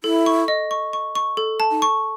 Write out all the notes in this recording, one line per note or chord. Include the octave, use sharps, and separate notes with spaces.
E4 A4
C#6
D#5
C#6
C#6
C#6
A4
A5
D#4
C#6